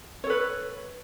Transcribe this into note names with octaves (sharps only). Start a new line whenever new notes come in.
A4 B4 C#5